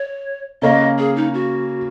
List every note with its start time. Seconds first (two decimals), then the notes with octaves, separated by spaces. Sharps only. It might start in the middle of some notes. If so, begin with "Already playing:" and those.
Already playing: C#5
0.62 C#3 A#3 C#4 D#5
0.99 G#4
1.16 D#4
1.34 F#4